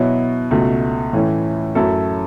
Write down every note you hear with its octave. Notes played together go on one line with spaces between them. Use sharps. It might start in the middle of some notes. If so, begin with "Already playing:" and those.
Already playing: B2 F#3 B3 E4 C#5
C#2 B2 A3 F#4
A2 E3 A3 C#4
F#2 F#3 A3 E4 A4